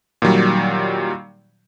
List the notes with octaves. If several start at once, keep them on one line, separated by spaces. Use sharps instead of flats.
A#2 D#3 F#3 G3